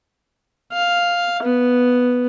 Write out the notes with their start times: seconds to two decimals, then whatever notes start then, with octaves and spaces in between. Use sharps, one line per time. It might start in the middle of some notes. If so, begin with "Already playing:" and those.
0.73 F5
1.43 B3